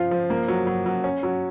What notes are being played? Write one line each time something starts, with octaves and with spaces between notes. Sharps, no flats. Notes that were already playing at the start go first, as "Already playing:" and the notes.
Already playing: F3 F4
F3
A#3
F#3
F#3
F#3
C#4
F#3